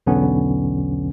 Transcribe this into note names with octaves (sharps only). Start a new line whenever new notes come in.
B1 E2 D3 B3 C#4